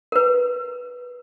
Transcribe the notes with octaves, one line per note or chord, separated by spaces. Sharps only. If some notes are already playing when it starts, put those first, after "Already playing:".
A#4 B4